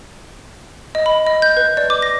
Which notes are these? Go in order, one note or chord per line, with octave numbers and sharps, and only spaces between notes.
D#5
B5
D#5
G6
B4
D5
D6
A#6